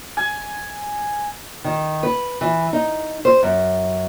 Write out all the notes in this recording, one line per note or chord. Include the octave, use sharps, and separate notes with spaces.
G#5
D#3
B4
E3
D#4
C5
F#2